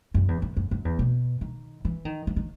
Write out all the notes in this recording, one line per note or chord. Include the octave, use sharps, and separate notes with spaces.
F#2
E2
F#2
F#2
F#2
E2
B2
D#3
E3
D#3
E3
D#3